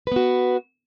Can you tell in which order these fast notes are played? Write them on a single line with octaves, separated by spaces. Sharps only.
B4 B3 F#4